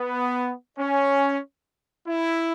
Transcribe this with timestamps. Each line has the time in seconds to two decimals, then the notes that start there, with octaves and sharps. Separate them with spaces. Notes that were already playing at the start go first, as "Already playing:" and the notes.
Already playing: B3
0.78 C#4
2.07 E4